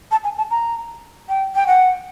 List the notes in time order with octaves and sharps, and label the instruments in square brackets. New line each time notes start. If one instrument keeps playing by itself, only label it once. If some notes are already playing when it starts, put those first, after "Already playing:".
[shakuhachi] A5
G#5
A5
A#5
G5
G5
F#5